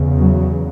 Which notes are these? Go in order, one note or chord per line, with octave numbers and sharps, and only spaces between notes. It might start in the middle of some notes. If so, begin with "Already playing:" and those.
Already playing: E2 C#3
F#3